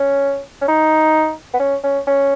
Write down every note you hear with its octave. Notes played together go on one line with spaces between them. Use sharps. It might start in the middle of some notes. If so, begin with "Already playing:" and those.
Already playing: C#4
C#4
D#4
B3
C#4
C#4
C#4